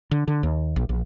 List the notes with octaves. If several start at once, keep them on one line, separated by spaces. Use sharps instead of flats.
D3
D3
D#2
A#1
A#1